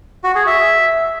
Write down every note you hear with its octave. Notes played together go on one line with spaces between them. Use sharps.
F#4
G#4
E5